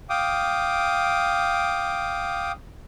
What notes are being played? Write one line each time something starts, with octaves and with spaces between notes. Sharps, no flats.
F5 G5 D6 D#6